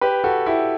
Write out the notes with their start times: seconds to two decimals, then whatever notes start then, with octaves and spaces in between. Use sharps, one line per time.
0.01 G4 B4
0.24 F#4 A4
0.46 E4 G4